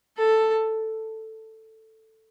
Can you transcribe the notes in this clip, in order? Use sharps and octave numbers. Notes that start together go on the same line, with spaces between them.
A4